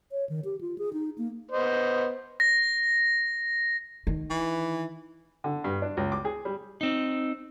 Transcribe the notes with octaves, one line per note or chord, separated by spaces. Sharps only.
C#5
D#3
G4
F4
G#4
D#4
A#3
B3 C5 D#5
A#6
D#3
E3
D3
G2
D4
C#2
D6
G#4
G3
C4 D#4